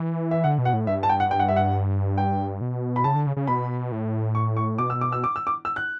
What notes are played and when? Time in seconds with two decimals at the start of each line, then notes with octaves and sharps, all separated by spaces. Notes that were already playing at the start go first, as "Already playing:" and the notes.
Already playing: E3
0.31 E5
0.44 D3 F#5
0.58 B2
0.65 F#5
0.73 A2
0.87 G2 E5
1.03 A5
1.09 G5
1.20 F#5
1.31 G5
1.40 F#5
1.48 E5
1.56 F#5
2.18 G5
2.61 B2
2.96 B5
3.04 C#3 A5
3.15 D3
3.27 C#3
3.37 C#3
3.47 B2 B5
3.92 A2
4.35 C#6
4.57 C#6
4.78 B2 D6
4.90 E6
5.01 D6
5.12 E6
5.24 D6
5.36 E6
5.47 D6
5.65 E6
5.76 F#6